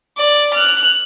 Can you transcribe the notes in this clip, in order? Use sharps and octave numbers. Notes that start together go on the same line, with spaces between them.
D5
F6 F#6